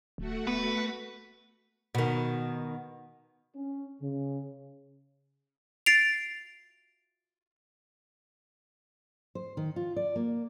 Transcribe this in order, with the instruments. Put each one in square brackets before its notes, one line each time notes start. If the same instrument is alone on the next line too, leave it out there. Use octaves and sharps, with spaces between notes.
[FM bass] D1 [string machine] A3 F#4 F#5
[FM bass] B3 [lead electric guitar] B4
[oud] B2 D#3
[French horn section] C#4
C#3
[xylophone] A6 C7 D7 F7
[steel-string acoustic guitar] C5
D#3
F4
D5
A#3